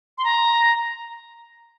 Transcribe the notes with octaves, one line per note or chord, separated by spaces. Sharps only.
C6
A#5